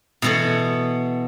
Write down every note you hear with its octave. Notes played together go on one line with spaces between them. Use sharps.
B2 E3 B3 E4 A4